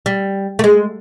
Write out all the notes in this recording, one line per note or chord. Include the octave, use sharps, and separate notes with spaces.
G3
A3
G#3